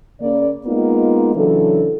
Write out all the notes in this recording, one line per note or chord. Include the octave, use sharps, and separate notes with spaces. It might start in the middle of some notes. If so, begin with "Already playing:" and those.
C#3 A#3 D5
G#3 A#3 B3 D#4 F4
C#3 E3 F#3 D4 A4